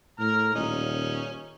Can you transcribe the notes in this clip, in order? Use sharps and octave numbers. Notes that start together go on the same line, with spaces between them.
A2 A#5 F6
D#1 C#4 D#4